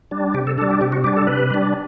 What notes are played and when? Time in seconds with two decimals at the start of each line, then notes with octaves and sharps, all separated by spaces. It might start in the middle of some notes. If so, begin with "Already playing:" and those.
0.11 G3 D4
0.34 C3 G4
0.47 A4
0.58 D4 A4
0.62 G3
0.70 G4
0.81 C3 G4
0.92 F#4
1.04 G3 D4 G4
1.17 A4
1.27 C3 B4
1.50 G3 D4